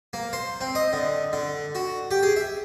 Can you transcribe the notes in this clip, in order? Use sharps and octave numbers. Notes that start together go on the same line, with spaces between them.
A#3
C5
C4
D#5
D3
D3
F#4
G4
G#4
E5